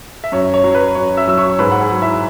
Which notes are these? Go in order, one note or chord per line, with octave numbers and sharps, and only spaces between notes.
E5
F#2 C#5
C#5
F#3
B4
F#2 C#5
E5 E6
F#3 E6
C#5 C#6
G#2 B4 B5
F#5
G#4 G#5
F#3
E4 E5